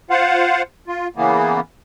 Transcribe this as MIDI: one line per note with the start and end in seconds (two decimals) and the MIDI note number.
0.10 0.62 65
0.10 0.62 72
0.10 0.62 77
0.10 0.62 78
0.87 1.08 65
1.16 1.60 49
1.16 1.60 52
1.16 1.60 58
1.16 1.60 59